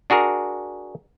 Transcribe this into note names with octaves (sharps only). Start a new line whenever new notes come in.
D4 F#4 G#4 A#4